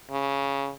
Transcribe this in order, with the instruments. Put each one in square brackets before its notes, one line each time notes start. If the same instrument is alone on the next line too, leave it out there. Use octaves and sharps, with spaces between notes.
[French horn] C#3